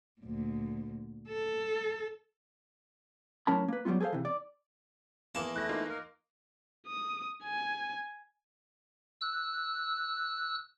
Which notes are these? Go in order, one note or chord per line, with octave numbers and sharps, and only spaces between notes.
D2 A#2
A4
A2 F#3 C#4 A#4 A5 B5
A#3 B4
F#3 G3 A3 B3 F4
G#4 A4 B4 C5 F5
C3 E3
D5
E2 A#3 A5
A3 E4 F#6 A#6
A#3 D#4 F4
A#4
D#6
G#5
E6 F#6